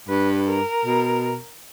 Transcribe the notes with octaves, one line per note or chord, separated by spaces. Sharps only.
G2 B4
A#4
B2